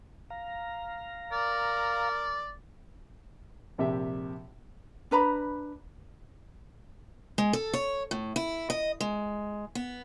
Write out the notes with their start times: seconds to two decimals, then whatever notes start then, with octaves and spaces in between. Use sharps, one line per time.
0.30 F5 A#5
1.32 A#4 D5
3.78 A#1 C3 G4 E5
5.11 D4 B4 A#5 B5
7.38 G#3
7.53 A4
7.73 C#5
8.11 A2
8.36 E4
8.70 D#5
9.00 G#3
9.75 B3